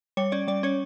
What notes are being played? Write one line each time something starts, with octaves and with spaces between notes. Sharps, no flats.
G3 C#5
C#4 D5
G3 D5
C#4 C#5